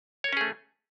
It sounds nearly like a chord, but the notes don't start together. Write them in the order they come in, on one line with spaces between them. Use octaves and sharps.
C#5 A#4 C#4 G#4 A3